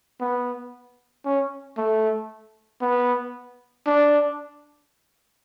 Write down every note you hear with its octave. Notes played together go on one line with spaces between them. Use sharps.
B3
C#4
A3
B3
D4